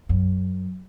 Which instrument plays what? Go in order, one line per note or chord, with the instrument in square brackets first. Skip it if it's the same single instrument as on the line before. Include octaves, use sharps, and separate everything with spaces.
[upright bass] F#2